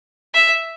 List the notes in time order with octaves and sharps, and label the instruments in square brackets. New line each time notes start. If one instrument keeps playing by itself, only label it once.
[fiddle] E5